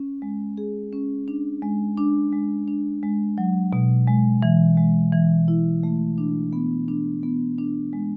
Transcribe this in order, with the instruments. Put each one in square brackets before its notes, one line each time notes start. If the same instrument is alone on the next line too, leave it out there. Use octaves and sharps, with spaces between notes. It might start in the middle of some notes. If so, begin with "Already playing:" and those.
Already playing: [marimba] C#4
G#3
G#4
C#4
D4
G#3
D4
G#3
D4
G#3
F#3
B2
G#3
E3
G#3
E3
E4
A3
D4
B3
D4
B3
D4
G#3